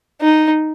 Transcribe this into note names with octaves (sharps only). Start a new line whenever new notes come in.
D#4